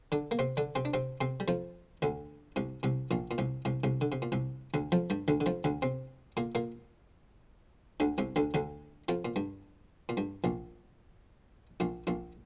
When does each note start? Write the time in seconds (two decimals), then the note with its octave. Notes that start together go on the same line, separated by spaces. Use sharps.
0.12 D3 D4
0.31 A#3
0.39 C3 C4
0.57 D3 D4
0.75 C3 C4
0.85 D4
0.94 C3 C4
1.21 C3 C4
1.40 G3
1.48 F2 F3
2.02 D2 D3
2.56 C2 C3
2.83 C2 C3
3.11 A#1 A#2
3.31 A#2
3.38 C2 C3
3.65 C2 C3
3.84 C2 C3
4.01 D3
4.12 C3
4.22 A#2
4.32 C2 C3
4.74 D2 D3
4.92 F2 F3
5.10 G2 G3
5.28 D2 D3
5.41 D3
5.46 F2 F3
5.64 D2 D3
5.82 C3 C4
6.37 A#2 A#3
6.55 A#2 A#3
8.00 D2 D3
8.18 C2 C3
8.36 D2 D3
8.54 D2 D3
9.08 F2 F3
9.25 A#2
9.36 G2
10.09 A#2
10.17 G2
10.44 A#1 A#2
11.80 A#1 A#2
12.07 A#1 A#2